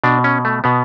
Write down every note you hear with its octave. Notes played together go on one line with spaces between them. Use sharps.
B2 D4
C#4
A3
B2 B3